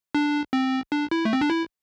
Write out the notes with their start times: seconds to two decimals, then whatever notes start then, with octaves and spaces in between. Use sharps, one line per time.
0.15 D4
0.53 C4
0.92 D4
1.11 E4
1.25 A3
1.33 C4
1.41 D4
1.50 E4